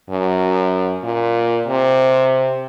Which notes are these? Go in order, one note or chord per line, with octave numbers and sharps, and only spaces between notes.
F#2
A#2
C3